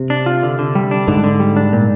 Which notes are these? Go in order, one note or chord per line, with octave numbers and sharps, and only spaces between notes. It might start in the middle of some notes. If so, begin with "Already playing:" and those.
Already playing: C3
D4
F4
D3
D3
G3
D4
G#2 D3
D3
G3
D4
A#2